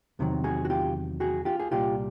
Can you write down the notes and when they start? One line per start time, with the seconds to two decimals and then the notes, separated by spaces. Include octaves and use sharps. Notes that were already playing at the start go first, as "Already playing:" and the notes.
0.19 E2 C3 D#3 F#3
0.44 F#4 G#4
0.65 F#4
0.70 F4 G4
1.20 F#4 G#4
1.45 F4 G4
1.60 G#4
1.71 C2 A#2 G3 F4 G4